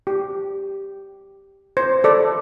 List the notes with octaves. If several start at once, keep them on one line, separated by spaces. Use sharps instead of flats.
G4
C5
A4 D5